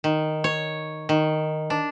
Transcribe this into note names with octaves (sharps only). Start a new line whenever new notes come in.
D#3
C#5
D#3
D4